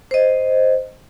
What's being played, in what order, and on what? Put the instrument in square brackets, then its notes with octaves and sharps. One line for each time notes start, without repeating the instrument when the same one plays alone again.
[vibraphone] C5 D#5